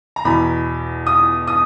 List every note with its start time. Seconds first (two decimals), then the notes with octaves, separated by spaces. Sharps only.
0.16 A#5
0.25 E2 B2 B5
1.07 D#6
1.47 D#6